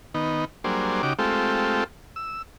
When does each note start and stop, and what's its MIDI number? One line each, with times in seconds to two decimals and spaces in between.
0.14 0.45 51
0.14 0.45 59
0.14 0.45 63
0.64 1.02 54
0.64 1.02 55
0.64 1.02 58
0.64 1.02 62
0.64 1.02 68
0.64 1.02 72
1.03 1.13 49
1.03 1.13 63
1.03 1.13 66
1.03 1.13 67
1.03 1.13 86
1.19 1.84 56
1.19 1.84 57
1.19 1.84 60
1.19 1.84 65
1.19 1.84 67
1.19 1.84 69
2.16 2.42 88